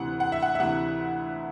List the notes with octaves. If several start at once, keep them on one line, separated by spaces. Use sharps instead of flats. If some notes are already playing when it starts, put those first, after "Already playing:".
Already playing: D2 C3 E3 F#5
F#5
E5
F#5
E5
D2 C3 E3 F#5